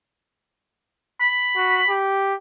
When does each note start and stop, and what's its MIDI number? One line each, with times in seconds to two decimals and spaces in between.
1.20 1.92 83
1.56 1.82 66
1.89 2.34 67